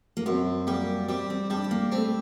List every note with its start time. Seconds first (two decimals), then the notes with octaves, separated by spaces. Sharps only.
0.17 A#3
0.26 F#2 C4
0.67 G3 A#3
1.09 G3 C4
1.30 C4
1.50 G3 D4
1.64 C4
1.71 A#3
1.92 A3 C4